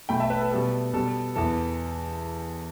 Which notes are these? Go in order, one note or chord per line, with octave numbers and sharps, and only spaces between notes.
B2 A3 G5 B5
E5 A5
B4
A4
B2 G3 B3 A4
B2 G3 B3 A4
E2 E3 B3 A4